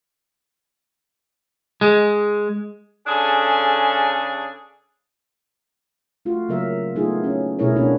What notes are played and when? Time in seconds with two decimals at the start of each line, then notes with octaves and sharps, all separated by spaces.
1.81 G#3
3.07 C#3 D4 G#4 A4 G#5
6.25 A3 F4 F#4
6.49 C#3 F#3 A#3 A#4 E5
6.95 E3 A3 B3 D#4 F4 G#4
7.24 C#4
7.59 B2 A3 E4 G#4 A#4 C#5
7.76 B2 A#3 B3 C#4 D4 F#4